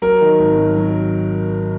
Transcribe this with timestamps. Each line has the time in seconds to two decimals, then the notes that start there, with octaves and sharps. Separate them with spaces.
0.02 F#3 A#4
0.21 D#3
0.39 G#1
0.58 F#3
0.77 F#3